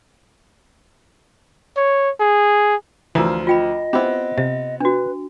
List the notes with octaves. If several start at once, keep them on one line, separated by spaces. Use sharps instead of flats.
C#5
G#4
D2 E3 F3 F4 A#4 A#5 D#6
F4 D#5 G5 B5
B3 C4 E4 G4
C3 E5
D4 F#4 B4